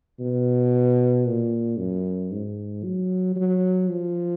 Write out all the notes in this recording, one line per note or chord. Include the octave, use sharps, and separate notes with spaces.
B2
A#2
F#2
G#2
F#3
F#3
F3